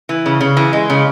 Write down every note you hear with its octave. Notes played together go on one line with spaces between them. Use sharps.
E3
C#3
C#3
E3
G#3
C#3